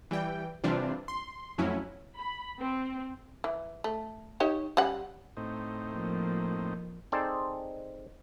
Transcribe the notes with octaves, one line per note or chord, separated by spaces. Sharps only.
E3 G3 G5
C3 E3 G3 C4 D4 F4
C6
F2 A2 F#3 C#4 E4
B5
C4
E3
A3
D#4 G4 C#5
G3 C#4 F#5
A2 C4 D#4
F3 A#3
C4 D#4 G#4 A4 C5 D5